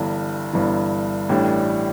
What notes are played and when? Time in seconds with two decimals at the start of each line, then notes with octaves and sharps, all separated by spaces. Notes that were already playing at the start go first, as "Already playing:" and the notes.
Already playing: G1 G2 E3
0.53 G1 G2 E3
1.29 A1 A2 E3 G3 D4